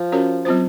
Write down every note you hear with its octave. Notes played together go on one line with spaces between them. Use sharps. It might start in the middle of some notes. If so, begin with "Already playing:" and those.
Already playing: F3
C#4 F#4 A#4 C#5
F#3 C4 F4 C5